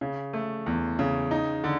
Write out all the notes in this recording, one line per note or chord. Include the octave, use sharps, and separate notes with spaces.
C#3
A3
E2
C#3
D#4
D3